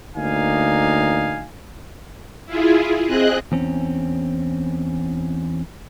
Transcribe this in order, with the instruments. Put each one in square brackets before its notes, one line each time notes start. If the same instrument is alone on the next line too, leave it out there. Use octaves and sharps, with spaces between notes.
[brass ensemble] D2 A#3 D#4 F5 G#5
[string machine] E4 F4 G#4
C4 G#4 D#5 F#6
[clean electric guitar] E2 C4 C#4